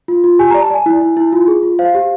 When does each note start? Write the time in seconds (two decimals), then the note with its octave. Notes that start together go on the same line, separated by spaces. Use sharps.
0.08 F4
0.24 F4
0.39 G4 G#5
0.51 A#5
0.54 D5
0.62 A5
0.70 D5 G#5
0.86 E4
1.01 E4
1.17 E4
1.33 F4
1.47 G#4
1.63 F4
1.79 C5 F5
1.95 G4